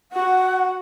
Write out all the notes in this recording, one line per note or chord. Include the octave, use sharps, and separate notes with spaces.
F#4 F#5